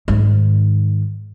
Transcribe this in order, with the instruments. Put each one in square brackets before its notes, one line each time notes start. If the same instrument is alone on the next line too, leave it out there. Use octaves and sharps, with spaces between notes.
[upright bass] G#2 D#3